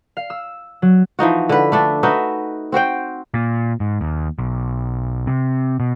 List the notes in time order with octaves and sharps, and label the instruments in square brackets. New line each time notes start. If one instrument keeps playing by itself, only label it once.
[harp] F5
E6
F#3
[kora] E3 F3 D#4 F#4
D3 B4
A3 D4 A4
D#4 F#4 B4 E5
C4 F#4 C5 G5
[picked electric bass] A#2
G#2
D#2
B1
C3
B2